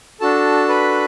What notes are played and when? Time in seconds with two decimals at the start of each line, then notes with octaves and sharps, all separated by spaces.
0.21 D4 F#4 A4 A5
0.69 B4 B5